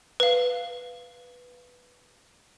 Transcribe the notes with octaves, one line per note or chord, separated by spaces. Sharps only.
B4 F5